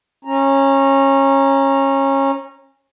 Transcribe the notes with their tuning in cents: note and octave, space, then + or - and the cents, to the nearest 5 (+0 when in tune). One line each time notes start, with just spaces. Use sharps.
C#4 -20 A#5 +0